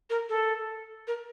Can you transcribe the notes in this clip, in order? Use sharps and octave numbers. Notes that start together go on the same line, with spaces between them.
A#4
A4
A#4